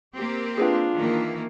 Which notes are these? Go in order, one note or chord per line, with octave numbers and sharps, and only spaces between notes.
A#3 C4 G4
D4 F4 G#4 B4 G5
D#3 E3 A#3